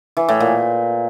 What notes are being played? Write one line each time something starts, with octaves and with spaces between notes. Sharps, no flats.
E3
A2
A#2